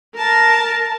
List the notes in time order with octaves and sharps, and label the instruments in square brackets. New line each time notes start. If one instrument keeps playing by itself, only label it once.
[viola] A#4 A5